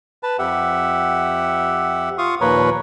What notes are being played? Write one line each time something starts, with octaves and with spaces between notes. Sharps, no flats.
B4 A5
F2 G4 E5 F#5
F4 F5 C#6 D#6
D#2 A#2 F3 A#4 B4 C#5